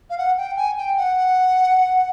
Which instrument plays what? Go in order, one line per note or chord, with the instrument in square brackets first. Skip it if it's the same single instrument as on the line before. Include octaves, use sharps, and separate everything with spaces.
[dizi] F5
F#5
G5
G#5
G5
F#5